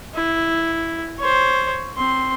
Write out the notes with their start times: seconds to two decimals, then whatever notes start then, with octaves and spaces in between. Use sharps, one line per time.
0.15 E4
1.19 C5 C#5
1.97 C4 C6